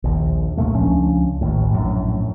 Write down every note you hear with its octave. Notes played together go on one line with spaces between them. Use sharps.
A#1 D#2
D#2 A#2 A3 A#3
C#2 F3 C#4 D4
A1 D#2 A2
A#1 F#2 A2